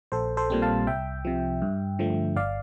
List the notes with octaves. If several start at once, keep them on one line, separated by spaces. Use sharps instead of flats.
A#1 A4 C5
A4 C5
A#2 G3 C4
F5 A5
C2 E5 G5
C3 F3
G2
D3 F3 A3
G1 D5 F5